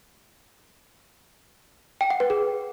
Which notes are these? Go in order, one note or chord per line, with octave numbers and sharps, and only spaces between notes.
G5
F#5
B4
G#4